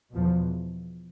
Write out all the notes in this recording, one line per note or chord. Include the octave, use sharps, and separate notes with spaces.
E2 B2 F3